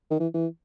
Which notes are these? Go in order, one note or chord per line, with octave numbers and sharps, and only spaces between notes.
D#3
E3
E3